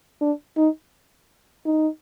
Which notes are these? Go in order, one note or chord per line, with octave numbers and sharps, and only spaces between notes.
D4
D#4
D#4